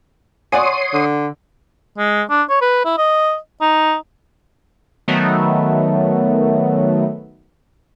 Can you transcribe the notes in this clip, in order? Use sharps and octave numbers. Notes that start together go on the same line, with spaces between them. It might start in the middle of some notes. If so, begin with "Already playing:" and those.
C#5 D5 F#5 G#5 C6 D#6
D3
G#3
D4
C#5
B4
E4
D#5
D#4
D#3 F#3 A3 B3